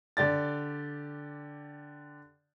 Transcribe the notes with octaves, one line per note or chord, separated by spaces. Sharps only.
D3 G4 D5 A6